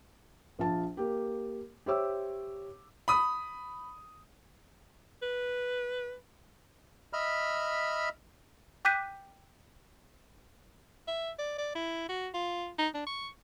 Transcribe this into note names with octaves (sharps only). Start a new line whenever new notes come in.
A#1 F4 A5
A#3 G4
G4 C5 C#5 E5 D6 E6
B5 D#6
B4
D#5 E5 B5 F6
G5 D6 F#6 G6 B6 D#7
E5
D5
D5
E4
F#4
F4
D#4
D4
C#6